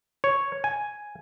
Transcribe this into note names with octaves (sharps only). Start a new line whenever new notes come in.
C#5
G#5